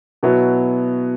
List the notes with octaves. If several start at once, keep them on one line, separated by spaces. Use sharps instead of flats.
B2 F#3 B3 E4